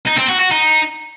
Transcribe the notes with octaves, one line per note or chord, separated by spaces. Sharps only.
D#4
C4
F#4
F#4
D#4